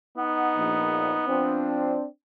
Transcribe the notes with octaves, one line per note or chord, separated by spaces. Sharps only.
B3 D#4 F#5
A#1
F3 C4 D4